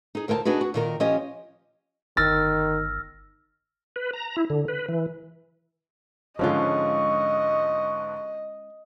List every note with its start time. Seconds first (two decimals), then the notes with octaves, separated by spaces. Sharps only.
0.15 D#4 G#4
0.28 D2 A#4 C5 G5 A5
0.45 D4 D#4 F#4 G#4 B4
0.61 F#4
0.74 A#2 D#3 A#4
1.00 F3 C#4 G4 C5 D#5
2.17 G1 D#3 E6 F6 A6 A#6
3.96 B4
4.13 A#5
4.37 E4
4.50 D3
4.68 B4
4.89 E3
6.39 G#2 D3 F3 G#3 C#4 F4 D#5 C#6